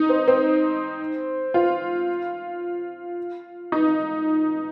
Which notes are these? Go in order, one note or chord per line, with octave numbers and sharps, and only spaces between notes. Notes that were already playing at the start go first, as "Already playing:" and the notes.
Already playing: D#4
C4
C4
F4
D#4